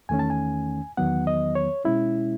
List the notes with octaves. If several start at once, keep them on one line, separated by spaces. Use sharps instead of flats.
E2 D#3 A3 C#4 G#5
A5
G#5
E2 D#3 F#3 B3 F#5
D#5
C#5
B2 G#3 C#4 E4